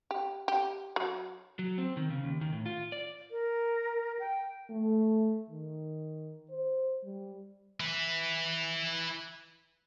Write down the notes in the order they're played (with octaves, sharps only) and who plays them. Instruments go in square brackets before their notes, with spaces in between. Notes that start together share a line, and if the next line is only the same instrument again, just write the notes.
[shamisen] G4
G4
F#3
[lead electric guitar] F#3
C4
D#3
C#3
D#2
D#3
A2
F4
D5
[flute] A#4
G5
[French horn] A3
D#3
C5
G3
[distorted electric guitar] E4 B4